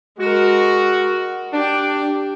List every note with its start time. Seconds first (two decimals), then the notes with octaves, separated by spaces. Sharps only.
0.19 G#3 F#4 A#4
1.53 D4 G4 G5